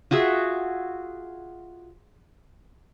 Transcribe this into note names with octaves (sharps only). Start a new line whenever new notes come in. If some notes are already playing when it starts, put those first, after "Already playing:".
F4 F#4 G#4 E5